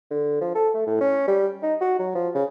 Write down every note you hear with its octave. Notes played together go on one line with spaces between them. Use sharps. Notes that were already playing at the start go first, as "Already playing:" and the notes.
D3
F3
A4
A3
A2
C#4
G3
D#4
F#4
F#3
F3
C#3